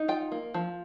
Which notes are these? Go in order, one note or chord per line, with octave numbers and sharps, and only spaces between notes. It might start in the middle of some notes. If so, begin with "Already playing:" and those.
Already playing: D#4
F4 G5
A#3
F3